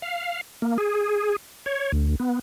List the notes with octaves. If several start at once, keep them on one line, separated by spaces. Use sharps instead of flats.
F5
A#3
G#4
C#5
D2
B3